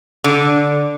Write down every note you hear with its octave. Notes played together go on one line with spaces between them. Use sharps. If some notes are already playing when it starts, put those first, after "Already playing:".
D3